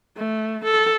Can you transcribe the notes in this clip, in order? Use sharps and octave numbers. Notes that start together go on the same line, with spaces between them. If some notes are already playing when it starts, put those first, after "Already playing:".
A3
A4